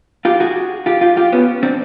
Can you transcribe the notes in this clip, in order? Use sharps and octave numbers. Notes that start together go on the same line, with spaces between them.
F4 G4
F#4 G#4
F4 G4
F4 G4
F4 G4
B3 C#4
C4 D4